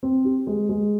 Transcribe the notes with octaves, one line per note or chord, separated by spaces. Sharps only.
C4
G4
G#3
G#3